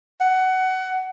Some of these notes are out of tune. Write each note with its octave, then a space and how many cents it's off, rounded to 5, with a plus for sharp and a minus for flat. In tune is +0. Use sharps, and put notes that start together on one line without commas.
F#5 +20